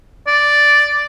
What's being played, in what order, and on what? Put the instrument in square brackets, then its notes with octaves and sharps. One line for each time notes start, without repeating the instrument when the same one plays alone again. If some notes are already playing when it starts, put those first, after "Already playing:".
[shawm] D5